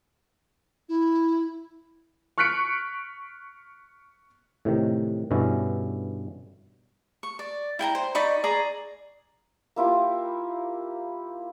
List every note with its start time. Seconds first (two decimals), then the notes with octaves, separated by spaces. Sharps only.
0.89 E4
2.38 C#6 F6 F#6 B6 C#7 D7
4.65 A2 C3 D#3
5.31 G2 B2 D3 C#4 E4
7.23 C#6
7.39 D5
7.79 E4 G5 G#5 A#5
7.95 C5
8.15 D#4 D5 B5 C#6
8.44 G#4 D5 A#5
9.76 A#3 E4 F4 G4